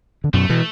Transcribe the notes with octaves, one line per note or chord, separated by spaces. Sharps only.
D3
F#2 B2 A3
B2 E3